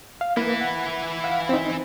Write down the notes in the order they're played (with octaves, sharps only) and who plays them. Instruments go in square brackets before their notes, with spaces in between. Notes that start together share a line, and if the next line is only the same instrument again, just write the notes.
[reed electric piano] F5
[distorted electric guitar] E3 E4 [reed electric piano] A#3 B4
[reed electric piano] F#5
F5 F#5
C4 D#4